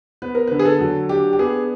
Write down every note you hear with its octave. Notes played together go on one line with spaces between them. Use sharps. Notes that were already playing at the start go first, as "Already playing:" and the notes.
B3 B4
A#4
D3 B4
G#4
A4
F#3
D4 G4
G4
B3 G#4